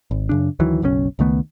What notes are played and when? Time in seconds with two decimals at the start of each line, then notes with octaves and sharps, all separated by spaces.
0.11 G#1
0.29 F#2 C#3 D4
0.59 D2 D#3 E3 F#3
0.82 F#1 B1 C3 C#4
1.19 C#2 D#3 A3 B3